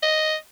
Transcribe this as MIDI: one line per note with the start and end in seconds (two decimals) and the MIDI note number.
0.02 0.35 75